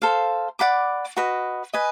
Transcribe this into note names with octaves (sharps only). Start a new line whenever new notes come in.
A4 C5 F5
D5 F#5 B5 D6
F#4 B4 D#5
B4 D#5 G#5